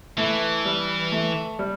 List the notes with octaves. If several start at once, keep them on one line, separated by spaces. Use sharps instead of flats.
E3 A3
G3
A3
G3